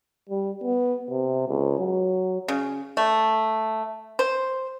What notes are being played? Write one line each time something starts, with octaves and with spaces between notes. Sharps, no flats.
G3
B3
C3
C#2
F#3
C#3
A3
C5